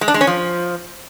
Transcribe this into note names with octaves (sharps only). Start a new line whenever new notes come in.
G#3
D4
G#3
C#4
F3